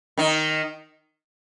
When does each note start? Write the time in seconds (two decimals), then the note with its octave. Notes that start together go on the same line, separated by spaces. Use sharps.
0.17 D#3 D#4